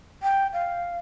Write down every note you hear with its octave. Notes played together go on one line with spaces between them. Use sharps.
G5
F5